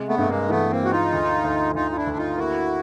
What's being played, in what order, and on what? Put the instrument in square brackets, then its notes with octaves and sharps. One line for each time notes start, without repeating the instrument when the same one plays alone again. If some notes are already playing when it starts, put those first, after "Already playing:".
Already playing: [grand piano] C3 G#3
[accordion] A3 B3
[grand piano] G2 [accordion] A3
[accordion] G#3 A#3
[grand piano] E3 [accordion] A3 B3
[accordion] A#3 C4
[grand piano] G#3 [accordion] F#4
[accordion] D#4 F4
[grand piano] D2
D2
[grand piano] D2 [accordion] D#4 F4
[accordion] F4
D4 E4
[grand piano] D2
[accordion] D#4 F4
[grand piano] A#3 [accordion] E4 F#4